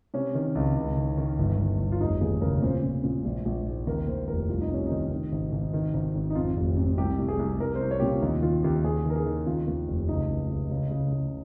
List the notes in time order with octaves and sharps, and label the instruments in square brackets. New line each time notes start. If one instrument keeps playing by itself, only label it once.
[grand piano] C3 C#4
D#3
C#2
C#2
D#3
D#3
G1
G1
G1
F4
F1 D#4
D#2 G#4
C#3 A#4
A#2 C5
A#2
A#2
A#1
A#1
G#2
D#2 A#4
D#2 C5
F1 A#4
C2 F4
D#4
C3 C#4
D#3 D#4
D#3
G#1
G#1
D#3
G#1
G#1
D#4
F2 F4
F1
F2
C2 G4
C2
G#4
C2
C2 A#4
C5
C2
C#5
A#2 G4
F4
D#2 D#4
D#3 F4
D#2 G4
D#2 G#4
D#3 A#4
G#4
D#3
D#2 F4
D#2
F1
C#2 D#4
C#2
C#2
C#3
C#3
C#3